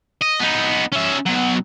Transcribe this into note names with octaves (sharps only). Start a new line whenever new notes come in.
D#5
B3 D#4
C#4 E5
B2 F#3